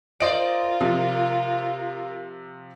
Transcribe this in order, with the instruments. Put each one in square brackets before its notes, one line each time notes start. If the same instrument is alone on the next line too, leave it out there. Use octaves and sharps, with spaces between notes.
[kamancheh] F4 A#4 [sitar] C5 D5 [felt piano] D#5 D7
[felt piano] C3 F3